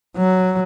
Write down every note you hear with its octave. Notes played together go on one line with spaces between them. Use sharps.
F#3